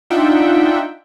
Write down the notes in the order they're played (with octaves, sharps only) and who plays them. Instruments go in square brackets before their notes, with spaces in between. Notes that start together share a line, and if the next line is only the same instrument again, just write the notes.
[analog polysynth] D4 D#4 F4 E5 F#5 G5